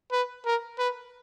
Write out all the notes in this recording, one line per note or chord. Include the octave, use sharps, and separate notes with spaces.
B4
A#4
B4